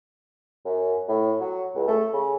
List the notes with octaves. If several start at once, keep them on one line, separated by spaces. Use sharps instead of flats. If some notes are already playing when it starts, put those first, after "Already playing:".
F#2
A2
F#3
C#2
A3
C#3